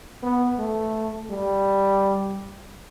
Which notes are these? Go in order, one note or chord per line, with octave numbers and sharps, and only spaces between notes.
B3
A3
G3